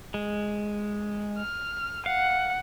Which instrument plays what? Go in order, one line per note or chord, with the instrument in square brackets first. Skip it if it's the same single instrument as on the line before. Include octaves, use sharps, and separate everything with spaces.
[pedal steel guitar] G#3
[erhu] F6
[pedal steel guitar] F5 [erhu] F#5